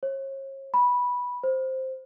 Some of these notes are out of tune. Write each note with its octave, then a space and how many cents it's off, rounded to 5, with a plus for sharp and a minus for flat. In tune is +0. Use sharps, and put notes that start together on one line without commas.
C#5 -40
B5 -10
C5 +0